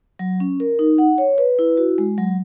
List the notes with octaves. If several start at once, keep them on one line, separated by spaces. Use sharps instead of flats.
F#3
C#4
A#4
D#4
F#5
C#5
B4
E4
F#4
G#3
F#3